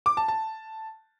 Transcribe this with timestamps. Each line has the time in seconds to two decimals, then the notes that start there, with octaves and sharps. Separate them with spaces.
0.06 D6
0.17 A5
0.28 A5